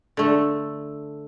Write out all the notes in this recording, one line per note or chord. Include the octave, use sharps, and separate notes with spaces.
D3 A3